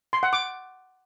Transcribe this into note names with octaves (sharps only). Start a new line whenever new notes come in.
C6
F#5
D6